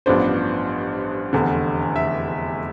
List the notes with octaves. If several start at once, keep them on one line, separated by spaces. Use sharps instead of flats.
A1 G2 F3 B3 D4 C5
F1 E2 D3
E5